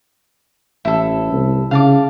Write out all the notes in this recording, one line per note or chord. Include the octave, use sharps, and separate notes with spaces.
A1 E4 A4
C2
C#3 F5 A5 D6